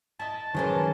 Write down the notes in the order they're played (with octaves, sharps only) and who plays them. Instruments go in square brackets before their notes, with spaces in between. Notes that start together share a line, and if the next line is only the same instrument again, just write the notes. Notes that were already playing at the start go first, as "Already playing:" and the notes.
[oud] E4 D#5 [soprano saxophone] A5
[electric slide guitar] D#3 F#3 A#4 [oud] E3 G#3 C5 [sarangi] C#4